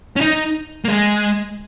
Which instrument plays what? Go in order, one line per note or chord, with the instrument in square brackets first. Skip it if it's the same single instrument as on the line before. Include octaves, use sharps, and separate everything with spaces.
[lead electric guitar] C#4
D#4
A#3
G#3